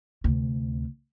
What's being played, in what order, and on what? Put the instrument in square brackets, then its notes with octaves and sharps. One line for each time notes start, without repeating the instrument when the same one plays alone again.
[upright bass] D2 C3